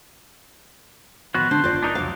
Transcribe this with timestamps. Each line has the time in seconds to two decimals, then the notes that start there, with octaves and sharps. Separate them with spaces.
1.34 A1 D#3 F3 B3 F#4 F#6
1.51 D3 D4 C5
1.64 F#1 E2 F4 D5
1.82 D4 D#4 A#4
1.95 C2 F2 F#3 F5